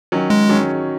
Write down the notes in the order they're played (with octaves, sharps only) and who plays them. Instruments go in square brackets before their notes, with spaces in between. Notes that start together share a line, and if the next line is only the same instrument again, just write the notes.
[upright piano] D#3 F#3 C#4
[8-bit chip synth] G#3
[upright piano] D#3 F#3 C#4